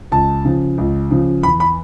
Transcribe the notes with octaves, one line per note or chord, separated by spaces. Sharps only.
C#2 A5
C#3 F3
C#2
C#3 F3
E2 B5
B5